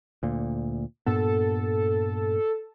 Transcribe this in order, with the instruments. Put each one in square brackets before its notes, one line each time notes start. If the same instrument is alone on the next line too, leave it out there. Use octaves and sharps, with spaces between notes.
[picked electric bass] D2 A#2
[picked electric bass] G2 A#2 B3 [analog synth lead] A4